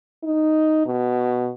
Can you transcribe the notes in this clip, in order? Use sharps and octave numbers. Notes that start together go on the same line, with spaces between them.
D#4
B2